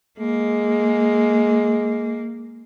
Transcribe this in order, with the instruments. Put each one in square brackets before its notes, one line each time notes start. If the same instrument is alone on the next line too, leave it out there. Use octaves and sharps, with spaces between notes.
[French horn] G#3 [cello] A#3